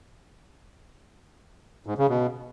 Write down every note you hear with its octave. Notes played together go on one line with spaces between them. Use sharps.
G#2
C#3
B2